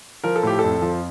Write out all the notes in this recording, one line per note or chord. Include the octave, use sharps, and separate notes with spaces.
F3 A#4
A4
A2 G4
F2 A4
F3